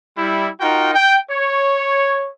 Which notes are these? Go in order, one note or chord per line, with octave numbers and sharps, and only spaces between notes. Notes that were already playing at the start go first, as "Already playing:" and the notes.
G3 E4
D#4 F4 F#4 A#4 G5
G5
C#5